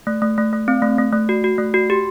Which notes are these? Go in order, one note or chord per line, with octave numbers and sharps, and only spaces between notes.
A3
A3
A3
A3
C4
A3
A3
A3
F#4
F#4
A3
F#4
G4